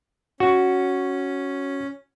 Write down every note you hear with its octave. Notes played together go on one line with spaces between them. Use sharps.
C#4 F#4